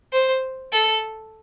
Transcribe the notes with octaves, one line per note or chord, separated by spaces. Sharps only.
C5
A4